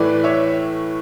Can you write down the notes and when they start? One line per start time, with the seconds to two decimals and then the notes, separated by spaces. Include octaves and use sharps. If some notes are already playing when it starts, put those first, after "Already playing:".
Already playing: A2 E3 A3 B4 D5
0.24 C#5 E5